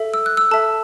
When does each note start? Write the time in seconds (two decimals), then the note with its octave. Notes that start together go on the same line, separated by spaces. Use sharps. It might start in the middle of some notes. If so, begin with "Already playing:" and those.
Already playing: A4 E5
0.14 E6
0.26 F#6
0.37 E6
0.51 A4 E5 A5